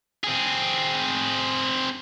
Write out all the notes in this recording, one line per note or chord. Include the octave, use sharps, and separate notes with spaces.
C4 G#4